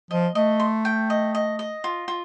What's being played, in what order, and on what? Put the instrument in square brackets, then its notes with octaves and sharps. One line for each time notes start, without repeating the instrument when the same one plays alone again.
[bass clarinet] F3 [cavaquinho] D#5
[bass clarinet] A3 [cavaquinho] D#5
[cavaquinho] C6
G5
D#5
D#5
D#5
F4
F4